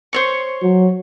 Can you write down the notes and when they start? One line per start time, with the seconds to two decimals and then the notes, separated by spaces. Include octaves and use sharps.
0.13 C5 C#5 C#6
0.62 F#3